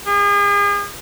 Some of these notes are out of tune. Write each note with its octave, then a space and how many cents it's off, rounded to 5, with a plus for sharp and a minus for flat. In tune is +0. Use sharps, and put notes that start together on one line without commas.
G#4 -40